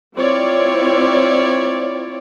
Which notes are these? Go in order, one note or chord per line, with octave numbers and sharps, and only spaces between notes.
C4 E4 F4 C#5 D5